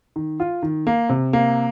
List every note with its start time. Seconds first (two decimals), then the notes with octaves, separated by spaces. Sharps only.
0.16 D#3
0.40 F4
0.63 D#3
0.87 A#3
1.09 C3
1.33 A#3